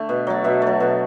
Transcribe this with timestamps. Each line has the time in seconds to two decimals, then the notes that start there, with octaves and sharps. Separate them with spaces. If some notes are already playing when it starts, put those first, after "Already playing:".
Already playing: D3 A3
0.09 B2
0.27 F#3 A3
0.44 B2 E5
0.62 A3
0.67 F#3
0.80 B2